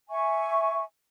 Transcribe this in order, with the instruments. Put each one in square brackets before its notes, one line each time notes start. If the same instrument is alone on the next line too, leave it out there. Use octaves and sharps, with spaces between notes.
[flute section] E5 G#5 C#6